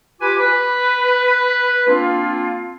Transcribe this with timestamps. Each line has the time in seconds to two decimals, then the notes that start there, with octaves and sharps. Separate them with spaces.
0.21 F4 G4 B4 G#5 B5 D6
0.40 B4
1.87 A#3 C4 D4 F4